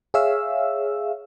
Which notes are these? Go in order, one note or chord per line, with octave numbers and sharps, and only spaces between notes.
G#4 C#5 E5 F5 E6